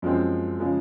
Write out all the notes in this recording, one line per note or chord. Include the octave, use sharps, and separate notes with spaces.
F#2 F3 G#3 C4
C#3 F3 G#3